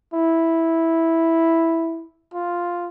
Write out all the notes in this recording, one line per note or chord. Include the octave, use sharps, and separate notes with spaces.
E4
F4